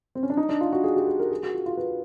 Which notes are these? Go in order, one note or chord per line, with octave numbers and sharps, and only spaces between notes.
C4
C#4
D4
D#4
D4
F4
F#4
G#4
G4
G#4
A#4
G#4
F#4
F4
F4
B4